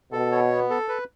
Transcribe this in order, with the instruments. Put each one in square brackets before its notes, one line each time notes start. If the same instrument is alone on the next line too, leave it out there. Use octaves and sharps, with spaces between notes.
[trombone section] B2 [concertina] A4
[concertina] C#5
B3
A4
B4